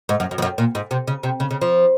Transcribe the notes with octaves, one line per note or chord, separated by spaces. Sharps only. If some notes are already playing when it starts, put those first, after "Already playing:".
G#2
F#2
F#2
F2
F#2
A#2
G#2
C3
C#3
C3
C#3
C#3
F3